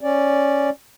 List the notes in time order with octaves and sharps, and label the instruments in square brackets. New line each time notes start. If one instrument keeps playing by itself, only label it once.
[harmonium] C#4 D5